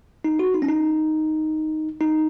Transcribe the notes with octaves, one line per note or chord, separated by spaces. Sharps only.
D#4
F#4
D#4
C#4
D#4
D#4